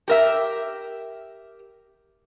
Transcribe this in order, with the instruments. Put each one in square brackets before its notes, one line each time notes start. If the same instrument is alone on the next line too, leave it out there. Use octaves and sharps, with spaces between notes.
[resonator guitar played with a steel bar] G4 A#4 E5